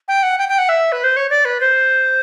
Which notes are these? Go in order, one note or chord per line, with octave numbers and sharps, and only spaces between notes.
G5
F#5
G5
G5
F#5
E5
B4
C5
C#5
D5
B4
C5